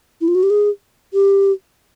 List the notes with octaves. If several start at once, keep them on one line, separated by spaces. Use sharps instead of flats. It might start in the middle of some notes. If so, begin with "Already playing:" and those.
E4
F4
F#4
G4
G#4
G4